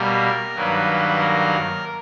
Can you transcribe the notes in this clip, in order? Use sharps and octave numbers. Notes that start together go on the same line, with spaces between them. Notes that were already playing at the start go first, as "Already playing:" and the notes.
Already playing: B2 G3 A#3 A#4
G2 D#3 F#3 A#3 B4
A#4